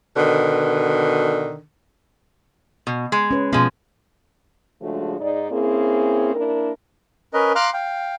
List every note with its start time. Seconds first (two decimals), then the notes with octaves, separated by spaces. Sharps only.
0.16 B2 D3 D#3
2.87 B2
3.12 G#3
3.31 C#4 B4
3.53 B2 F3 G#3 B3
4.82 C#3 F3 G#3 A3 D4 F#4
5.20 G#2 D#4 G#4 D5
5.51 A#3 C4 C#4 E4 G#4
6.34 A#3 D4 E4 A#4
7.34 C#4 A#4 B4 D#5
7.55 F5 A#5 C6 D6 F6 F#6
7.74 F5 G5